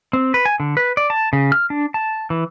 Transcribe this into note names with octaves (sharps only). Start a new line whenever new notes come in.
C4
B4
G#5
D3
B4
D5
A5
C#3
F6
D4
A5
E3